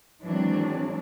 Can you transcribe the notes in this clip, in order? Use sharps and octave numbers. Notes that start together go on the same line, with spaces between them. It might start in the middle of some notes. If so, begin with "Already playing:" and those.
D#3 E3 F#3 G#3 C4 D4